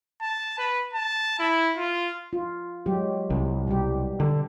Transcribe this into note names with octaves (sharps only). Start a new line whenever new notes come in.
A5
B4
A5
E4
F4
F4
F#3 G#3 G4
C2
B2 G3 G4
D3